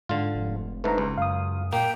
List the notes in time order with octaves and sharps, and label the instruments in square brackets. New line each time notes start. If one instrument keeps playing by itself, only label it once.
[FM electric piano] G#2 [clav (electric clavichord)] D3 F4
[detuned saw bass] F1
[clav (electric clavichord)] G#2 D3 A3 [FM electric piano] B4 A#5
[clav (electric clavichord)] C#2
[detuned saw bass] F#2 [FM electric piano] F5 D#6
[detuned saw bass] A#2 [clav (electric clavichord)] A#3 [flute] G5